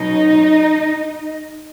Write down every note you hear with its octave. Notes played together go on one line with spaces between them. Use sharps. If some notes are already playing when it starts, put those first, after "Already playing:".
Already playing: B2 F#3 C#4 D#4 D#5